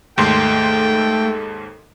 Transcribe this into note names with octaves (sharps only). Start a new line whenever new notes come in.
D#2 G#2 A3 A4 G5 C6